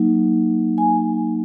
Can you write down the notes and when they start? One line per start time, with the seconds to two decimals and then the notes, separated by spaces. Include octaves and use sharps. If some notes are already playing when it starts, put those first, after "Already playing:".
Already playing: F#3 A#3 D#4
0.78 G#5